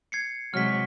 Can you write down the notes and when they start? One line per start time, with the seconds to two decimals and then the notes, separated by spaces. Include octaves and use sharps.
0.12 G#6 C7 C#7
0.54 C3 F#3 G#3 F6 B6